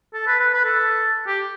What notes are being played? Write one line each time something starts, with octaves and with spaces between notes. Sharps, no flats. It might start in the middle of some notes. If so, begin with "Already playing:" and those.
A4
B4
B4
B4
A4
G4